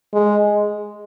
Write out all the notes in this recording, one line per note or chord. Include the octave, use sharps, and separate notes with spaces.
G#3